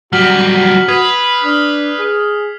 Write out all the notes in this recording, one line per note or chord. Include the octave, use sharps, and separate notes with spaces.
F#3 G3 F#4 F6 B6 F#7
B4 D#6 G#6 C7
D4 D#6 F6
G#4